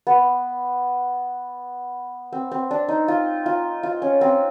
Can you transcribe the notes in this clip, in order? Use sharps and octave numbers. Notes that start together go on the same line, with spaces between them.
B3
C4
C4
D4
D#4
F4
F4
F4
C#4
C4